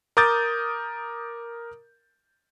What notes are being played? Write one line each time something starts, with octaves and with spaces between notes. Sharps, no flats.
A#4 D6 D#6 G6 A6